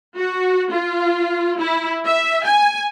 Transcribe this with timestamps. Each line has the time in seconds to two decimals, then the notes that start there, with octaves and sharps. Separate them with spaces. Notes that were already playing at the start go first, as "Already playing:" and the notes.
0.15 F#4
0.70 F4
1.58 E4
2.06 E5
2.44 G#5